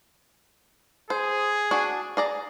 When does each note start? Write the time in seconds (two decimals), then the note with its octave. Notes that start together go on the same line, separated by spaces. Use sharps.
1.10 G#4 C5
1.71 D4 F#4 G#5
2.17 G#4 D5 A#5